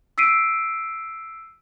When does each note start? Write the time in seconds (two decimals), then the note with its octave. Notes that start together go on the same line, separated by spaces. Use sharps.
0.18 E6 B6 C7 D7 D#7